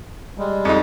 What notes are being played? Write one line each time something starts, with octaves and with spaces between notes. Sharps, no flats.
G3 G#3
F2 D#4